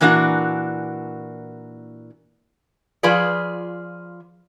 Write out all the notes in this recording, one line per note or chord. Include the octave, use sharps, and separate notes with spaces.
A#2 E3 A#3 D4 F#4
F3 F4 G#4 B4 D5